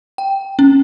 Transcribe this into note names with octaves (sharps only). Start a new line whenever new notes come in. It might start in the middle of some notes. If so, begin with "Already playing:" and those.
G5
C#4